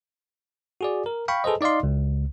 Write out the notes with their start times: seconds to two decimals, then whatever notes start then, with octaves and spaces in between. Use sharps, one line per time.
0.81 F#4 G#4 D5
1.06 A#4
1.28 F5 G5 B5 C#6
1.44 G#4 A4 B4 C5 D#5
1.61 D#4 D5 D#5 F5 C6
1.83 C#2